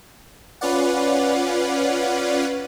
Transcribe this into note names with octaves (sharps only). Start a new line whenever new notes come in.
C#4 F4 B4 D5 F#5